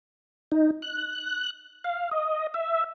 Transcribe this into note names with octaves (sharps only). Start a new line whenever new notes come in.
D#4
F#6
F5
D#5
E5